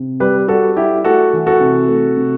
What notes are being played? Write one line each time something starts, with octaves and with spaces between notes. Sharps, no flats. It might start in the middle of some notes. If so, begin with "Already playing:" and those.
Already playing: C3
G3 G4 B4
G3 F#4 A4
G3 E4 G4
A3 F#4 A4
E3
F#4 A4
C3
A3
C3